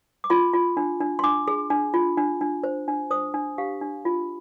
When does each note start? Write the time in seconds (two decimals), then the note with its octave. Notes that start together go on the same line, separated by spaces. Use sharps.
0.24 D6
0.30 F4 C6
0.53 F4
0.77 D4
1.00 D4
1.19 C6
1.23 D4 D6
1.48 G#4
1.70 D4
1.94 F4
2.17 D4
2.41 D4
2.64 C5
2.88 D4
3.11 C5 D#6
3.34 D4
3.58 G4 F5
3.81 D4
4.05 F4